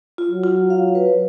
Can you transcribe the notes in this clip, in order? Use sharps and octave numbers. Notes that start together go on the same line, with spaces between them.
F4
F#3
F4
F5
B4